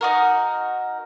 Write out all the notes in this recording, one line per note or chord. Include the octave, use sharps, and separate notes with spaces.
D#4 F#4 A#4